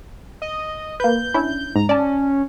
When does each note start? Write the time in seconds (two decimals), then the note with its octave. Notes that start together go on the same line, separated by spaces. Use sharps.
0.42 D#5
1.00 A#3 B4 G6
1.34 C#4 D4 E4
1.76 G#2 A#5
1.89 C#4 D5 A5